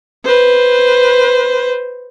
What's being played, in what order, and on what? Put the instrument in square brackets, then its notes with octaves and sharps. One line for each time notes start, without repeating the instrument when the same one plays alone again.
[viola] B4 C5